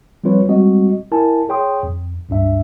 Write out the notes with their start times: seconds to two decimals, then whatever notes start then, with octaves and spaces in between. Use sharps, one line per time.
0.24 F3 G3 C4 F4 B4 C#5
0.48 G3 G#3 C4 F#4 D#5
1.12 E4 A#4 G#5 A5
1.49 G#4 C#5 G5 C6 D#6
1.83 F2
2.29 C#2 G2 D4 E5